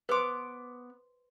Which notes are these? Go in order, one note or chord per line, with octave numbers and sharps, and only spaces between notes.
B3 B4 C5 C6 D6